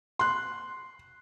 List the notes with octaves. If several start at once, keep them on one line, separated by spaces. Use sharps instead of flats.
C6 F#6